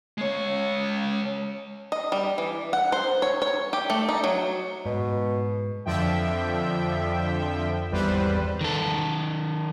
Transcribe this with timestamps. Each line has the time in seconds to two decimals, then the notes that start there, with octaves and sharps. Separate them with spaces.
0.18 G#3 C#5
1.92 D#5
2.12 G3
2.38 E3
2.73 F#5
2.92 C5
3.22 C#5
3.42 C#5
3.73 G4
3.90 A3
4.09 D#4
4.24 F#3
4.86 G#2 B2
5.85 F2 D3 F3 E5 G5
7.91 G#1 E2 G3 B4 C5
8.61 D#3 A4